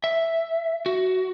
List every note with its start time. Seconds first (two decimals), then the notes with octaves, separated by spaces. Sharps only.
0.04 E5
0.86 F#4